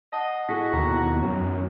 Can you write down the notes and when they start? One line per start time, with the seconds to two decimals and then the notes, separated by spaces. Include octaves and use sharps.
0.13 D#5 F#5 A5
0.49 E4 F#4 G#4 A4 A#6 B6
0.73 D#2 B2 D#3 E4 A#5
1.22 F#2 D#3 F#3 C#4